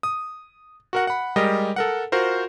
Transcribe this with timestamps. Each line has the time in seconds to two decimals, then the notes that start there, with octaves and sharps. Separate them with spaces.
0.03 D#6
0.93 F#4 A#4 F#5
1.07 F#5 B5
1.36 G3 G#3 G4 A#4 D#5
1.76 A4 A#4 F#5
2.12 F4 F#4 A#4 C5